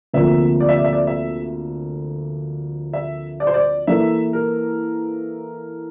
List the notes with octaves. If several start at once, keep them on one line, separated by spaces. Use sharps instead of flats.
D2 C3 F3 A#3 E5
D5
E5
D5
E5
D5
E5
E5
D5
C5
D5
E3 A#3 E4 A4 E5
A#4